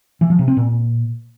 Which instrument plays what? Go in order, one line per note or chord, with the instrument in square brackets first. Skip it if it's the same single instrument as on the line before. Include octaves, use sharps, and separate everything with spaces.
[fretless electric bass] E3
F3
C3
C4
A#2